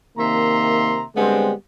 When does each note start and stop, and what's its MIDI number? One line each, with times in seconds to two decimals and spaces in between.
0.18 1.04 48
0.18 1.04 51
0.18 1.04 58
0.18 1.04 76
0.18 1.04 82
0.18 1.04 84
1.16 1.52 50
1.16 1.52 55
1.16 1.52 56
1.16 1.52 59
1.16 1.52 60